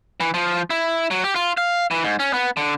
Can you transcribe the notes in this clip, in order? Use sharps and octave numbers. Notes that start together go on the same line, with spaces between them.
E3
F3
E4
F#3
G4
F4
F5
E3
G#2
C#4
B3
D3